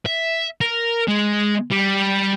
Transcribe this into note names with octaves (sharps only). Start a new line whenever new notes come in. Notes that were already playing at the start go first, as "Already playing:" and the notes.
E5
A#4
G#3
G3